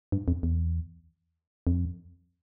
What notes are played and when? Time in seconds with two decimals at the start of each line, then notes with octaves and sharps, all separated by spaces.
0.12 G2
0.28 F2
0.43 E2
1.67 F2